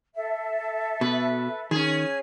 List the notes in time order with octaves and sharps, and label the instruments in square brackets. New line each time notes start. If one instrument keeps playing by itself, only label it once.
[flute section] A4 E5
[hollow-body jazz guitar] B2 [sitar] B4
[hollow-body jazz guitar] D#3 [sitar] C#4 G#4